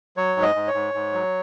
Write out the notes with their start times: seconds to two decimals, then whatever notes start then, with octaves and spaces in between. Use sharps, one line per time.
0.17 F#3 C#5
0.36 G#2
0.42 D#5
0.55 G#2
0.68 C#5
0.74 G#2
0.94 G#2
1.13 F#3